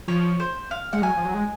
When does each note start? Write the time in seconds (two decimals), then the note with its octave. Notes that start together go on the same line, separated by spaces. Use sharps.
0.08 F3 C#5
0.40 C5
0.71 F5
0.93 G#3 F#5
1.02 F#3 G#5
1.17 F3
1.25 F#3
1.34 G#3